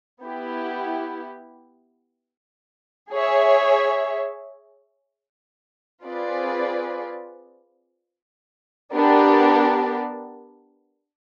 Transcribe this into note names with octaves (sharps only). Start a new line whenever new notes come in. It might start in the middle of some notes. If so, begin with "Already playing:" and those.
B3 E4 G4
G#4 C#5 E5
C4 F4 G#4 B4 D5
B3 D4 G4 A#4 D5